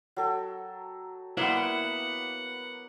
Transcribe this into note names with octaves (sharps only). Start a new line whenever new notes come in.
F#3 A4 G5
A#3 B3 E4 B4 C5 D5 F#5